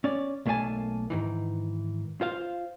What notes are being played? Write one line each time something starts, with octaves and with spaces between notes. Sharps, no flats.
C#4 D5
B1 A3 A#3 C#5 G#5 A5
G#2 D#3 E3
F4 C5 F5